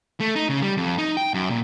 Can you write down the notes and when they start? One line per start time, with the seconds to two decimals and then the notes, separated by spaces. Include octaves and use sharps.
0.20 A3
0.36 D#4
0.49 C#3
0.62 G3
0.77 F2
0.98 D#4
1.17 G5
1.34 F#2
1.50 A#2